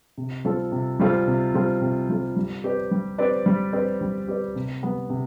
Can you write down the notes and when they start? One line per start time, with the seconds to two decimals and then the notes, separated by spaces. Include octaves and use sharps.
0.18 C3
0.45 G3 C4 F4 A4
0.72 C3
1.00 G3 C4 F4 A4
1.27 C3
1.54 G3 C4 F4 A4
1.81 C3
2.09 G3 C4 F4 A4
2.36 G3
2.64 C4 G4 B4 D5
2.91 G3
3.18 C4 G4 B4 D5
3.46 G3
3.73 C4 G4 B4 D5
4.01 G3
4.27 C4 G4 B4 D5
4.55 C3
4.83 G3 B3
5.10 C3